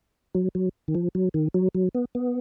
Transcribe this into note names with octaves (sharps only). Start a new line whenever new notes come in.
F#3
F#3
D#3
F3
F#3
D#3
F#3
F#3
B3
B3